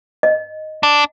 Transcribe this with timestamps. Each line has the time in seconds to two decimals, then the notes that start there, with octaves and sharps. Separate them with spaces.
0.23 D#5
0.83 D4